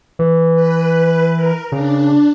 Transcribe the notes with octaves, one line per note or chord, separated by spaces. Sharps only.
E3
B4
A#4
C#3 D4